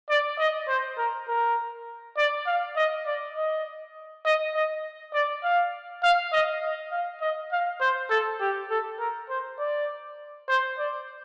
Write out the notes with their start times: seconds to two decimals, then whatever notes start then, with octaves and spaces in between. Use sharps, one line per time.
0.10 D5
0.39 D#5
0.68 C5
0.98 A#4
1.28 A#4
2.17 D5
2.47 F5
2.76 D#5
3.06 D5
3.36 D#5
4.25 D#5
4.55 D#5
5.13 D5
5.44 F5
6.03 F5
6.33 D#5
6.63 D#5
6.92 F5
7.21 D#5
7.52 F5
7.81 C5
8.10 A4
8.41 G4
8.70 A4
8.99 A#4
9.30 C5
9.59 D5
10.48 C5
10.79 D5